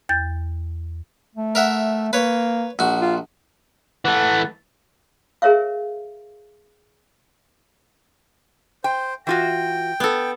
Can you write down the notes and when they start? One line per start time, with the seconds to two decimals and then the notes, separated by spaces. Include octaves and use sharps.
0.09 E2 G6 A6
1.36 A3
1.55 A#4 E5 F#5
2.13 A#3 B4 C#5
2.79 A#1 F#4
3.02 F4
4.05 E3 A3 F#5
5.42 G#4 A#4 C#5 E5 F5
8.84 C5 G5
9.27 E3 F4 F#4 G5
10.00 B3 A4